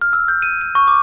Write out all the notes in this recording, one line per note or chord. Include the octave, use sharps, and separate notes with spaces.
F6
E6
G6
D#7
D#7
C#6
D6